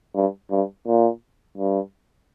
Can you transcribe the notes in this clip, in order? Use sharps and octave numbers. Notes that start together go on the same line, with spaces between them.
G2
G2
A#2
G2